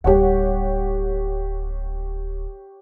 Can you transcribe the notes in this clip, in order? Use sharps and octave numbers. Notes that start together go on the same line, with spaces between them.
D1 G3 G4 C#5 F#5